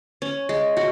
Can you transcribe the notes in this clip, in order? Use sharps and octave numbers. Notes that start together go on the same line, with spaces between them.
C#4
G#3
F#4